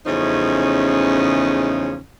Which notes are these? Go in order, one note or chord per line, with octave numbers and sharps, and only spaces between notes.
E2 C#3 F3 A3 C#4 D#4